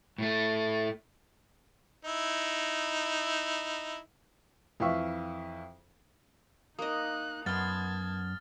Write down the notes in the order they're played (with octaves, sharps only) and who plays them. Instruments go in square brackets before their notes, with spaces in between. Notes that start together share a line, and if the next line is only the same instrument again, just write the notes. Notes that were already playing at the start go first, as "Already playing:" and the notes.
[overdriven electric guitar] A2 A3
[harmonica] D#4 E4
[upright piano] F2 E3 E4 E5 F5 C#6
[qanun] A#3 D#5 [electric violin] D#4 F#6 [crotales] D#6
[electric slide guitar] F#2 [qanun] B3 C6 [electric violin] A5 G#6 [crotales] F6 A6